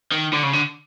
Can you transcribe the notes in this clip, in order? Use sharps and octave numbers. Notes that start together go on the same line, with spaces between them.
D#3
D3
C#3
D3